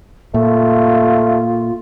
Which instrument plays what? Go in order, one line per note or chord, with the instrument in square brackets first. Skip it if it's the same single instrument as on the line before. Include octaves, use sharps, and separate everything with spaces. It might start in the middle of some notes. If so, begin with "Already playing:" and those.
[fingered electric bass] A#2 [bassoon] A3 [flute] F4